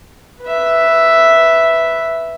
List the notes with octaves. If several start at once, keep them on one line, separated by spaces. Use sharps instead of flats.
B4 E5